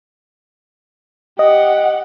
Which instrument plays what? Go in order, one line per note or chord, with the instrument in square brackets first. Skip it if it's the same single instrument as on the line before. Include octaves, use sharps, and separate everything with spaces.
[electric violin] G4 F#5 [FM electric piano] D#5